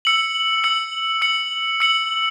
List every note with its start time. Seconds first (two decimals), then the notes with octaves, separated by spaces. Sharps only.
0.05 E6 C#7 F#7
0.64 E6 C#7 F#7
1.22 E6 C#7 F#7
1.80 E6 C#7 F#7